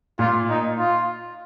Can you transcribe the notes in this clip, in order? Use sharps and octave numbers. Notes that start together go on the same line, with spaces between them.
A#2 F4
D#4
F4